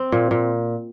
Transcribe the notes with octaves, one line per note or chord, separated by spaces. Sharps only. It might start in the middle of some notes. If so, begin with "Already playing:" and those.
Already playing: C4
A#2
A#2